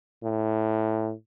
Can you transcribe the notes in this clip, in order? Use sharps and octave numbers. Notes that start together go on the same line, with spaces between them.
A2